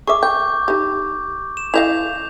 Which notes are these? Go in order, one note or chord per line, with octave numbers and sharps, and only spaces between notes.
G#4 E5 C#6 D6
G5 G6
D#4 G4
E7
E4 D#5 F5 G6 F7